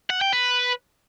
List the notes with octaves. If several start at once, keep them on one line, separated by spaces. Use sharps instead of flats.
F#5
G5
B4